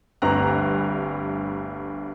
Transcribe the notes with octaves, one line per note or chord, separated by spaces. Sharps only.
G1 D2 G2 C4 A#5 F#6